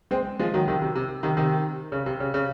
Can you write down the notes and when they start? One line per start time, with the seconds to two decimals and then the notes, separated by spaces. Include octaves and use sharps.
0.11 G#3 C4
0.40 F3 G#3
0.54 D#3 F#3
0.68 C3 D#3
0.82 C3
0.95 C3
1.23 C3 D#3
1.37 C3 D#3
1.92 C#3
2.06 C3
2.20 C#3
2.34 C#3